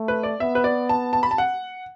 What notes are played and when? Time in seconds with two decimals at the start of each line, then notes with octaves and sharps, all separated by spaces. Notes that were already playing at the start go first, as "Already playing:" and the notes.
Already playing: A3
0.08 B4
0.23 D5
0.40 B3 E5
0.55 B4
0.64 D5
0.89 A5
1.13 A5
1.23 B5
1.31 A5
1.38 F#5